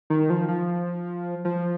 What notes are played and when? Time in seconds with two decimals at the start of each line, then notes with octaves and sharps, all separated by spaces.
0.10 D#3
0.30 F3
0.48 F3
1.45 F3